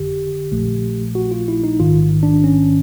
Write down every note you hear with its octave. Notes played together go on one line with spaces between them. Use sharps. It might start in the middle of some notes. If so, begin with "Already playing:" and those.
Already playing: G1 F2 D3 G4
A#1 A#2 F3 A3
F#4
F4
E4
D#4
A1 G#2 D#3 F4
D4
C#4